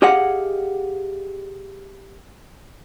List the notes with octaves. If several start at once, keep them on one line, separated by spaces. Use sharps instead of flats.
G4 G#4 D#5 F5 F#5